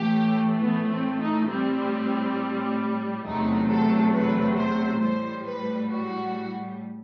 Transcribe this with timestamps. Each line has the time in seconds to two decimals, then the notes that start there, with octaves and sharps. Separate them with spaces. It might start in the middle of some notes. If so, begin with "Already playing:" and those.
Already playing: A2 E3 A3 G4
0.61 B3
0.91 C4
1.20 D#4
1.49 A2 G3 C4
3.25 E2 C3 F#3 A3 D#4
3.70 A4
4.14 B4
4.58 C5
5.01 A2 G3 C5
5.46 B4
5.90 F#4